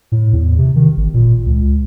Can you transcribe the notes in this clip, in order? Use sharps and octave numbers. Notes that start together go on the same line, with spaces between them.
A2
E2
C3
D#3
G#1
A#2
C#2